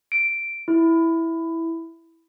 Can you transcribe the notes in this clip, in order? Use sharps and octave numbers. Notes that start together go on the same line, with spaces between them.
D7
E4